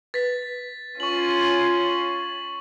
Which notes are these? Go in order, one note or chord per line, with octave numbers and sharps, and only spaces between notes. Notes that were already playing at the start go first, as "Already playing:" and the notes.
B4 A6 B6
C#4 F4 C#5 G#5 C6 C#6 F#7